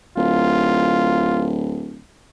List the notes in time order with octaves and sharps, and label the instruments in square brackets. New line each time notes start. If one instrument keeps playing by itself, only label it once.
[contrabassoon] D1 [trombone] F4